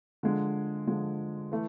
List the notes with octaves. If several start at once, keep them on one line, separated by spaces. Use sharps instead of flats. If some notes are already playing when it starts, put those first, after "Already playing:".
D3 F3 G#3
D3 F3 G#3
E3 A3